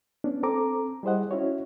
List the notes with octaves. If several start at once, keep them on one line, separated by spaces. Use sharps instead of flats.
B3 C#4 D4
C4 A4 A#5 D6
G3 E4 G#4 C5 D#5 F#5
C#4 E4 F#4 C#5